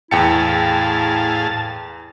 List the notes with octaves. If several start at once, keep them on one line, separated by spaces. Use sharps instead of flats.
E2 A2 E4 G#4 F5 G5 A5 C#7